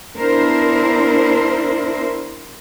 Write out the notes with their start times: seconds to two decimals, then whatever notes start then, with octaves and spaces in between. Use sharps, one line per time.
0.17 B3 D4 E4 A#4 C5